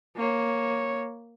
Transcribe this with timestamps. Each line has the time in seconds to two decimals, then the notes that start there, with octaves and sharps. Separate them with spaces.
0.17 A#3 C#5